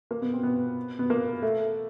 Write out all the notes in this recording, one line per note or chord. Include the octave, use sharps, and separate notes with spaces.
A#3
B3
C4
B3
B3
A#3
A3